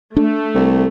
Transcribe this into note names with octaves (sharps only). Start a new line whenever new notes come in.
A3 D4
C2